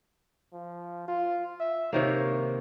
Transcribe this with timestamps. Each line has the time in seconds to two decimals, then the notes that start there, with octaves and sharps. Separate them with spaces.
0.53 F3
1.08 F4
1.60 E5
1.93 C3 D#3 A#3 C#5